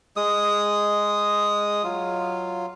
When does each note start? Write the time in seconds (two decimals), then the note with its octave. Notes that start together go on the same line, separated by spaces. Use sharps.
0.17 G#3 D#6
1.84 F#3 F4